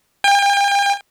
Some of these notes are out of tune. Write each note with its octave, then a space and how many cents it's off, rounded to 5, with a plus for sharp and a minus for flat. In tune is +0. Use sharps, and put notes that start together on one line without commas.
G5 +40